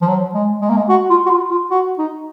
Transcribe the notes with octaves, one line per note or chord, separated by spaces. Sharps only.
F3
F#3
G#3
G#3
A#3
G#3
F#4
F4
F#4
F4
F4
F#4
D#4